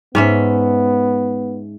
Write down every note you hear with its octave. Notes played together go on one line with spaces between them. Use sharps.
G#2 B3 C#4 E5